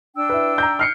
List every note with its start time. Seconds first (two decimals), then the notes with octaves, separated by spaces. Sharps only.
0.16 D4 G5 E6
0.30 E4 B4
0.58 A#5 G6
0.79 F6 C7 C#7